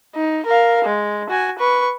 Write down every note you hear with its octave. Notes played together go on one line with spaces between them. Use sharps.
D#4
A#4 F5
G#3
F#4 G#5
B4 C#6